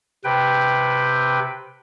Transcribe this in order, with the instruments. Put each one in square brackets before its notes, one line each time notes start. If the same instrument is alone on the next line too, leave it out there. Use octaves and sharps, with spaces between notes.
[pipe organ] C3 B4 G5